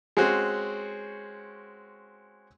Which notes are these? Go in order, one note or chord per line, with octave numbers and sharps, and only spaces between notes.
G#3 C4 C#4 F#4